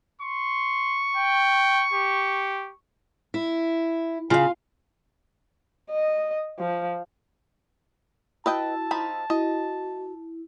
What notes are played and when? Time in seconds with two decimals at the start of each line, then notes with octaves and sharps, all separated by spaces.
0.21 C6 C#6
1.16 G5
1.93 G4
3.34 E4
4.30 C#3 F4 F5
5.90 D#5
6.59 F3
8.46 E4 F#4 B4 D#5 G5 A5 E6
8.91 F3 D#4 B5
9.30 E4 F#4 D#5